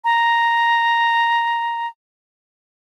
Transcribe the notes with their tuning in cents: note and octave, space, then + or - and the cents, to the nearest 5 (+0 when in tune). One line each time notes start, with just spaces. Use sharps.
A#5 +0